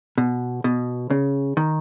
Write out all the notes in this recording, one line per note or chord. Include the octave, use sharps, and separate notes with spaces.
B2
B2
C#3
D#3